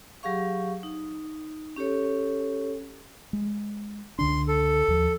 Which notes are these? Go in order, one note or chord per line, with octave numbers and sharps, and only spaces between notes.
F#3 G4 G#4 F5 C#6
D#4
C#4 G4 A4 C#5
G#3
C#2 D3 D4 C6
A4
D#2 F3